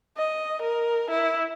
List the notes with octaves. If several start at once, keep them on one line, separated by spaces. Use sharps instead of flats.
D#5
A#4
E4